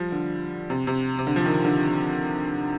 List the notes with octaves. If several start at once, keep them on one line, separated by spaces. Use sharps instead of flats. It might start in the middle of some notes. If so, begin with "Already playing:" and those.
Already playing: F3 G3
D3
C3
C3
C3
D3
F3
D#3
D3